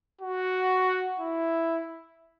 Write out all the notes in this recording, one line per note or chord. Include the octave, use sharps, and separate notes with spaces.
F#4
E4